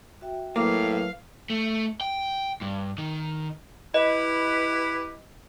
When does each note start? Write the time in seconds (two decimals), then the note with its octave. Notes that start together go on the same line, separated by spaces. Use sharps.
0.21 F#4 E5 G5
0.56 A2 F#3 A#3 B4 F5
1.50 A3
2.01 G5
2.61 G2
2.98 D#3
3.94 E4 G4 B4 D#5